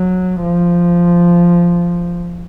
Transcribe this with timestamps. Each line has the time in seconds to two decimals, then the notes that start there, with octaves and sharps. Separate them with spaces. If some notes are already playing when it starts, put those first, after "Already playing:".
Already playing: F#3
0.43 F3